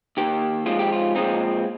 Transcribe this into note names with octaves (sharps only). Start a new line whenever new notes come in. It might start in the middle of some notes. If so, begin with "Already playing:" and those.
D#2 D#3 A#3 G4
G#2 F3 G#3 C4 F4
G4
F4
A#2 F3 G#3 C4 D#4